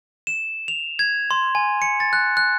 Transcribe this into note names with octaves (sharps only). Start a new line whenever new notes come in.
E7
F7
G#6
C6
G#5
C#7
A6
F#6
F#6